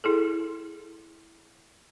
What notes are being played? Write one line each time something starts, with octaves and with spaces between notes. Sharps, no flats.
E4 G#4 A4